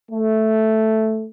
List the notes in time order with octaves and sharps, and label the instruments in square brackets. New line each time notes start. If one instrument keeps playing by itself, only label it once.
[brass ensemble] A3